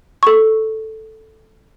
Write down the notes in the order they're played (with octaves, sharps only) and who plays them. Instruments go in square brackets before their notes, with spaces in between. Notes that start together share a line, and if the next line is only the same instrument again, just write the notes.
[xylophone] A4 C#6